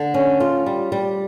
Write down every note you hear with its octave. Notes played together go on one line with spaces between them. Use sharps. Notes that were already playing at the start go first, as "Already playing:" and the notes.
Already playing: D3
C#4
F4
G3
G3